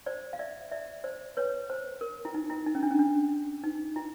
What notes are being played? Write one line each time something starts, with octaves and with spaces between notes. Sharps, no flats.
C5 D5
F5
D5 E5
D5 E5
C5 D5
B4 C#5
C5
A#4
E4
D#4
E4
D#4
C#4
D4
C#4
D4
D#4
E4